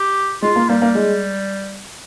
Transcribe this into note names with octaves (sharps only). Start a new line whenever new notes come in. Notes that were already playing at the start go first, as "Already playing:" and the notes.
Already playing: G4
G#3 F4
A#3
G3 A#3
A#3
G#3